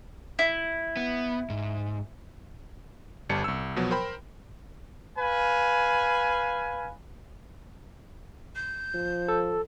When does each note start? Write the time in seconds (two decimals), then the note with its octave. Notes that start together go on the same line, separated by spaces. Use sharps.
0.39 E4
0.97 B3
1.50 G#2
3.29 G1 G3 A5 C#7
3.44 C2 E6
3.76 B2 F3 F#3 B3
3.91 A#4 C5 G5 B5
5.19 B4 F5 G#5
8.56 G6
8.95 F3
9.28 A4